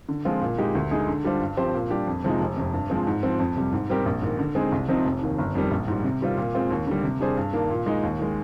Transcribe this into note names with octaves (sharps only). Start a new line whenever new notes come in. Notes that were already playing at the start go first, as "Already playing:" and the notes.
D3
F3 G#3 C4 F4
A#2
G#3 D#4 G4
D2
D3 G#3 D#4 G#4
D3
G3 D4 F4 C5
G2
F3 C4 G4 C5
A#2
G3 D4 G4
F2
C3 F3 G#3 D#4
F1
F2 C3
G2
F3 G#3 C4
G#2
F3 C4
F2
C3 G3
G#2
G3 C4 G4 A#4
A#1
G#2 D#3
D3
G#3 C4 D#4 G#4
C2
C3 F3 C4 D#4
F1
D#2 D#3
G1
F2 D#3 G3
A#1
G#2 G3
C3
D#3 G3 C4 F4
A#2
G#3 C4 F4
D#2
D3 G3
C3
G3 D4 G#4 C5
G2
D#3 A#3 D4
A#2
G#3 D#4
D#2
D#3 G#3